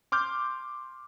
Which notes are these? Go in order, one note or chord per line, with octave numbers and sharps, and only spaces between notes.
C6 D6 F6 G6